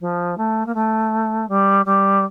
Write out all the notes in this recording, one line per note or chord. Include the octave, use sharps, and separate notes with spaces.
F3
A3
A#3
A3
G3
G3